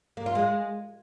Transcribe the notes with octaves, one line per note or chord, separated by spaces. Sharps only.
A#3
F4
G#3